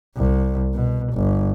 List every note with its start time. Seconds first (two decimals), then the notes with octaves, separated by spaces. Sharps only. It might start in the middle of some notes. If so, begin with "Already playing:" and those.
0.17 C2
0.74 B2
1.13 G1